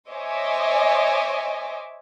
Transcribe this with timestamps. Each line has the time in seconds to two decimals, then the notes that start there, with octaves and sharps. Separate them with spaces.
0.12 C5 C#5 D#5 E5 G#5 D6